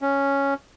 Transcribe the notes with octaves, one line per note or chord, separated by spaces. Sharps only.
C#4